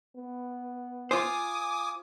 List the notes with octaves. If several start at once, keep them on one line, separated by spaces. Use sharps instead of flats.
B3
F4 C5 G#5 D6 D#6